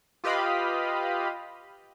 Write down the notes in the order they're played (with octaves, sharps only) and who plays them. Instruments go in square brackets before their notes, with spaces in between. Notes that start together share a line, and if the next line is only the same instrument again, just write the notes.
[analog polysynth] F4 G4 B4 D#5 F5 B5